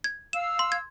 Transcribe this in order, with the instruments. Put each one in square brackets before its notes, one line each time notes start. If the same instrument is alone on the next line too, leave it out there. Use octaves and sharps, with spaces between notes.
[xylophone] G#6
[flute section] F5 E6 [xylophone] E7
[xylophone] C6
G#6